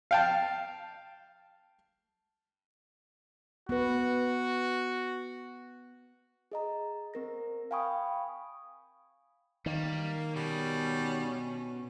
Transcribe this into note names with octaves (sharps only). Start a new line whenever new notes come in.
F5 G5 A5
B3 F#4 B4
G#4 D#5 A#5
C4 A#4 A#6
F5 G5 G#5 B5 C#6 D#6
D#3 G3 A#3
B2 G3 C#4